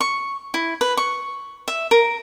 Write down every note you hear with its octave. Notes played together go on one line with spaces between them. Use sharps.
C#6
E4
B4
C#6
E5
A#4